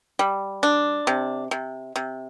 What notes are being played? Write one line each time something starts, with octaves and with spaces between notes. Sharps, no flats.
G3
D4
C3
C3
C3